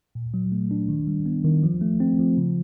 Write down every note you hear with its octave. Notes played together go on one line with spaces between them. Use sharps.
A#2
F#3
A3
D4
D#3
G3
B3
D#3
F3
A3
C4
F3
C#3